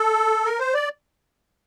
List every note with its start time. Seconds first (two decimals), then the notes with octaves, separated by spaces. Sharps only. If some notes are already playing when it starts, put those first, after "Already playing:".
Already playing: A4
0.45 A#4
0.59 C5
0.74 D5